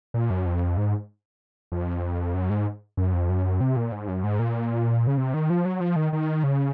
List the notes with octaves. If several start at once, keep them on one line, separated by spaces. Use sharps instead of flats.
A#2
F#2
F2
G#2
F2
F#2
G#2
F#2
F2
F#2
C3
A#2
G#2
F#2
G#2
A#2
C#3
C3
D#3
F3
F#3
F3
D#3
D#3
C#3